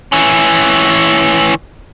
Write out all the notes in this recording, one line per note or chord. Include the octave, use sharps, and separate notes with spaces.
E3 C#4